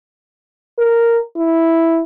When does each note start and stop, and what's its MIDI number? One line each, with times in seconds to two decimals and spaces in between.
0.79 1.21 70
1.36 2.02 64